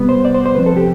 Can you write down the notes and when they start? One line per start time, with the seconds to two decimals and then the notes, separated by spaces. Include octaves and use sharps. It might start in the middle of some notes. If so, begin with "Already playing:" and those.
Already playing: C3 G3 B3
0.09 C5
0.25 D5
0.35 C5
0.46 C5
0.55 C3 F3 C4 B4
0.66 A4
0.77 G4